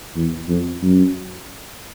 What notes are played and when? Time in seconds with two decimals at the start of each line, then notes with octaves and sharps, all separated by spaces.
0.15 E2
0.48 F2
0.82 F#2